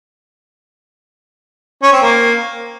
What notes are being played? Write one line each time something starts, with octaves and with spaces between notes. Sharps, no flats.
C#4
C4
A#3